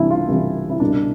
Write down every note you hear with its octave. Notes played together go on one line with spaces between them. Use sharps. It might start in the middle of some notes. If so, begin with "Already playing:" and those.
Already playing: C2 C3 E3 D4 E4 F4
F4
C2 C3 E3
E4
C2 B2 D4